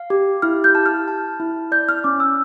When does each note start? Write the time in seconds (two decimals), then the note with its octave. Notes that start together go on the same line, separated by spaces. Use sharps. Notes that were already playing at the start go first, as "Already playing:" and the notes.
Already playing: F5
0.10 G4
0.42 E4 F6
0.64 G6
0.75 A5
0.86 F6
1.08 A5
1.40 E4
1.72 D5 G6
1.89 F6
2.04 C#4 D6
2.20 E6